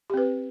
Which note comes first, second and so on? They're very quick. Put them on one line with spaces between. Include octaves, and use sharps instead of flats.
G4 C4 B4